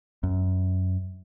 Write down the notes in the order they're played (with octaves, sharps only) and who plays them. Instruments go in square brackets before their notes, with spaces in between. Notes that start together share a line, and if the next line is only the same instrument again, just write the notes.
[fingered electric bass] F#2